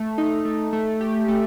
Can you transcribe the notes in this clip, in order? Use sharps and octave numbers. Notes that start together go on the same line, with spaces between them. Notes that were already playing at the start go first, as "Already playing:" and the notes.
Already playing: A3
D#4
A3
A3
G4
A3